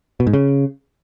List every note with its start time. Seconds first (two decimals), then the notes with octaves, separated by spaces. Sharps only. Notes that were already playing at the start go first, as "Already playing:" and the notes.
0.20 B2
0.27 G#2
0.33 C#3